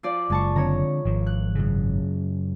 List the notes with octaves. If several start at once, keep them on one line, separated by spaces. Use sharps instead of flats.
F3 F4 D5
F#1 G#3 A5 C#6
D3 C4 C#5 A#5
G#1 D#3 F3
F#6
F#2 C#3